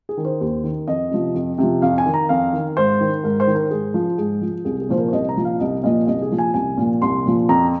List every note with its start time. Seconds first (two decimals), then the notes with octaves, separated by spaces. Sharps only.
0.09 G#4
0.17 D#3
0.25 C5
0.41 D#2
0.64 D#3
0.88 F2 D#5
1.11 C3 F3
1.35 F2
1.58 C3 F3
1.82 F2 F5
1.98 G#5
2.06 D#3
2.14 A#5
2.29 F2 F5
2.53 D#3
2.77 G#2 C5
3.01 D#3
3.24 G#2 A#4
3.40 C5
3.47 D#3
3.55 A#4
3.71 G#2 G#4
3.94 F3
4.18 G#2 G#4
4.42 F3
4.65 C2 G#4
4.81 G#4
4.89 A#2 F3 C5
4.97 A#4
5.08 C5
5.12 C2 D#5
5.29 A#5
5.36 A#2 F3
5.45 F5
5.60 C2 D#5
5.84 A#2 F3 D#5
6.07 C2 D#5
6.22 G#4
6.31 A#2 F3
6.38 G#5
6.54 C2 G#5
6.77 A#2 F3
7.02 C2 C6
7.26 A#2 F3
7.49 F2 A#5